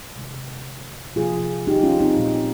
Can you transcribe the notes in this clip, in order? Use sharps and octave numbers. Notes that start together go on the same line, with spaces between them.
C3 D#3 G#3
C3 F3 A#3 F4 G#4
D#4 G4
C#4 F4
C4 D#4
A#2 G#3